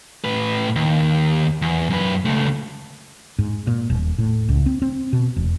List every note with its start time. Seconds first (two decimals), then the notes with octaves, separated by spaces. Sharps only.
0.25 A2 B4
0.76 D#2
1.62 E2
1.90 F#2 B4
2.25 C#2 A3
3.39 G#2
3.67 A#2
3.90 D#1
4.18 A2
4.49 C#2
4.66 C4
4.82 C4
5.13 B2
5.36 E1